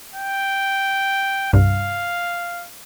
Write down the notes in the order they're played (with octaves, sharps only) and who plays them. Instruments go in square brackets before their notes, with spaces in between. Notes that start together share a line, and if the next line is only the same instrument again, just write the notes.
[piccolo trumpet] G5
[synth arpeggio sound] C2 G2 [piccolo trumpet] F5